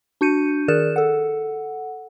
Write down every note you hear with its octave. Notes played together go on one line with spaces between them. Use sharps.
D4 F#4 G6 C#7 D#7
D#3 G#4 A#4 D5 F#6 E7
A4 F#5